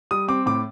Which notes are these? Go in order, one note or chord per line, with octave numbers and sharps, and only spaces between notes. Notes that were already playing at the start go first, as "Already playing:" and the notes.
G3 D#6
C4 D6
A2 D6